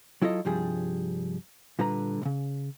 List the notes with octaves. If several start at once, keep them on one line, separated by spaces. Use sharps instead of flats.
F#3 E4 F4 A4 D#5
C2 G2 F3 G3 G#4
A#2 D3 G3 B4 A#5
B1 C#3